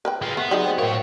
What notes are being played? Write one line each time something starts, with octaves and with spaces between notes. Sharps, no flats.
A#4 B4 G5
G#3 F4
A3 B3
F#3 C4 D#4 F#4 G#4 D5
C5 G5
A2 A#4 C#5 F5 G5